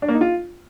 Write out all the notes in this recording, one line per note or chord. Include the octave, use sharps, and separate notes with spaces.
D4
A#3
D#4
F4